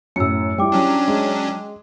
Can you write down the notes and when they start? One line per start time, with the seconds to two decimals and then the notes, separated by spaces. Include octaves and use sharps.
0.16 F#2 A2 E6 C#7
0.58 G3 E4 G5 D6
0.72 F#3 C#4 D4
1.08 G#3